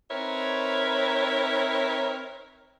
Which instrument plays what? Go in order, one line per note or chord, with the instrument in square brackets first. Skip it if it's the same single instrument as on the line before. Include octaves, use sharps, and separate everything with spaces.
[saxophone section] C4 D#4 A#4 B4 C#5 E5